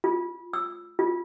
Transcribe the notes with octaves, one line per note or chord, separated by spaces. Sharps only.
F4
E6
F4